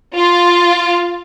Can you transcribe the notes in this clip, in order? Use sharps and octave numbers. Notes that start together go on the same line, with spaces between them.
F4